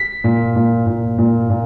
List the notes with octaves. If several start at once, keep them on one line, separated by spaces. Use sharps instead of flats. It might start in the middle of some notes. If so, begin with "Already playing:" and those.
Already playing: B6
A#2
A#2
A#2
A#2
A#2